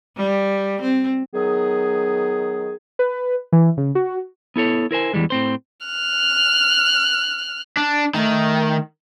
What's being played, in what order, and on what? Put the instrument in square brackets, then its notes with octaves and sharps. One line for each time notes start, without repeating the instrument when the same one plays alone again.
[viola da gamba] G3
C4
[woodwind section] D#3 F#3 B3 G#4
[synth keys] B4
E3
C#3
F#4
[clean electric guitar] B3 E4 A4 C#5
E4 A#4 C5 G#5
E2 G2 E3 G3 G#3
A2 C4 C5
[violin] F6 F#6
[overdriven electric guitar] D4
[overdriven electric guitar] D#3 [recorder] A3